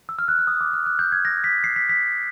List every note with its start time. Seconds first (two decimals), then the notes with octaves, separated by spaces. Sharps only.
0.09 E6
0.19 F6
0.28 F#6
0.39 F6
0.47 D#6
0.61 D6
0.73 F6
0.86 F#6
0.99 G6
1.12 G#6
1.25 A#6
1.44 B6
1.64 C7
1.76 B6
1.89 B6